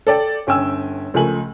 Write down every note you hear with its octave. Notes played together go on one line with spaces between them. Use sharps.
A4 D5 G5
G1 C#4 G5 G#5 E6
C#2 F3 A3 A#4 G#5 F#7